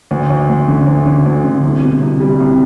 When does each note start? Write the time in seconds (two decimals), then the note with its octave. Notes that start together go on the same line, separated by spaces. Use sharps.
0.11 D2
0.30 D2
0.49 D2
0.68 D3
0.86 D2
1.06 D3
1.25 D2
1.44 D3
1.63 C2
1.82 B2
2.01 C2
2.20 G3
2.40 C2